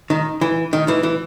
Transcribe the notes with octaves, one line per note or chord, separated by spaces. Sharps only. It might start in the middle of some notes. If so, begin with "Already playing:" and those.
D#3
E3
D#3
E3
E3